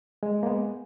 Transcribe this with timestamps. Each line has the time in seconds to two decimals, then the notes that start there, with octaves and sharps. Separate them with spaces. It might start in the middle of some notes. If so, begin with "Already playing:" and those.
0.23 G#3
0.43 A#3
0.46 G#3 B3